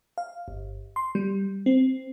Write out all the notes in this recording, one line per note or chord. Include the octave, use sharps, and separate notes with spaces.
F5
G1
C6
G3
C4